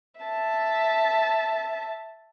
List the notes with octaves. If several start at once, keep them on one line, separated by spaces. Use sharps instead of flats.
E5 A5